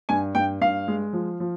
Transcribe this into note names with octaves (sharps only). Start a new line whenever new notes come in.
G2 G#5
G2 G5
G2 F5
G#3
F3
F3